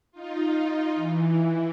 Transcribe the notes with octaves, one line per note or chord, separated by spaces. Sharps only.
D#4 F4
E3